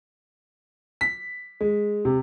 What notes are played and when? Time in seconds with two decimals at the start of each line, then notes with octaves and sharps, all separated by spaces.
1.01 B6
1.61 G#3
2.05 C3